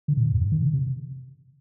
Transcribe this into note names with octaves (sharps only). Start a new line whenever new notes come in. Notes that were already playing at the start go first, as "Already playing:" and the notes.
D3
A#2
A2
F2
G2
D#3
C3
C3